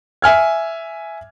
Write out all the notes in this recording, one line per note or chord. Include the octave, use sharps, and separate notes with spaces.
E5 G#5 F6 G#6